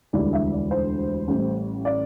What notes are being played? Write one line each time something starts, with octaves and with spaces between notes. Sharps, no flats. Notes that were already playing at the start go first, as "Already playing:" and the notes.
E1 D2 D3 G3 E4 D5
E5
D5
C5
A1 A2 G3
D5